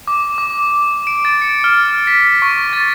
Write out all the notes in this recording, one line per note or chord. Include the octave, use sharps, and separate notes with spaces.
D6
D6
D7
A6
C#7
F6
B6
C#6
A6